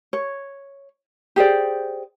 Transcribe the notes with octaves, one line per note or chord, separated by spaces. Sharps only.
C#5
G4 G#4 C5 D5